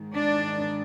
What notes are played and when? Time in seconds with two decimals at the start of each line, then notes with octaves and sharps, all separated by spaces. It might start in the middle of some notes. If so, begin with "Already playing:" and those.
Already playing: G#2 D#3
0.14 D4